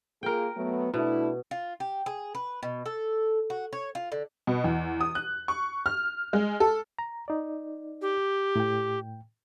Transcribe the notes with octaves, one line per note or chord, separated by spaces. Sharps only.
A#3 F4 G#4 A#4 G5
F#3 A3 B3
B2 A3 D4 E4
F4
G4
G#4
B4
B2
A4
F#4
C#5
F4
D3
B2
E2
D#6
F#6
C#6
F6
G#3
A4
A#5
D#4 D5
G4
A2 G5